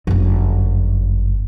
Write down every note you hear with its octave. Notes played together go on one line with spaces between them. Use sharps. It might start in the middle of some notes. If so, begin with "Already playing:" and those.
G1 F#2